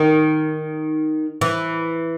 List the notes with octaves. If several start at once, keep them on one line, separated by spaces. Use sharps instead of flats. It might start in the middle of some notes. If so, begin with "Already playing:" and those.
Already playing: D#3
E3